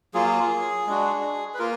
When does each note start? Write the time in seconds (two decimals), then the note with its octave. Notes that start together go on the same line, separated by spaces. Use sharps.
0.14 F#3 A#3 F4 G#4
0.87 G#3 D4 F#4
1.54 B4
1.59 A#3 F4 A#4